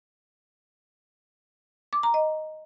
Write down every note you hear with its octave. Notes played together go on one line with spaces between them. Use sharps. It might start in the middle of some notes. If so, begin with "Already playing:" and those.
D6
A#5
D#5